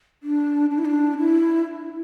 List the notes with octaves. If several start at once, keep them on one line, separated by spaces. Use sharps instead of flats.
D4
D4
E4
D4
E4